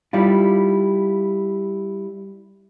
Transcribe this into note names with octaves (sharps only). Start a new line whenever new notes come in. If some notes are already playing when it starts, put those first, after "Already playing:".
G3 E4 F4